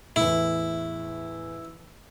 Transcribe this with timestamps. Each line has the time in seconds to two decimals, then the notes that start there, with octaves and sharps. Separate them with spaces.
0.16 E2 A2 E4